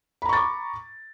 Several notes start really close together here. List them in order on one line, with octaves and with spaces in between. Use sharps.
B5 A#5 C#6 A6 D6